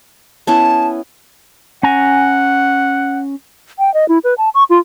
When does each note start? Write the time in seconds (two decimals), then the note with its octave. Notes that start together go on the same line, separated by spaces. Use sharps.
0.47 B3 C#4 E4 A5
1.83 C#4 F#5 G#5 A#5
3.79 G5
3.94 D#5
4.09 E4
4.24 B4
4.38 A5
4.55 C#6
4.70 F4